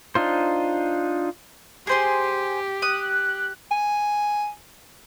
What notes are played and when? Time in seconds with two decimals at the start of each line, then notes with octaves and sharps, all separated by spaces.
0.15 D4 D#4 F4 C5
1.87 G4 G#4 C5 C6
2.82 D#6 F#6
3.71 G#5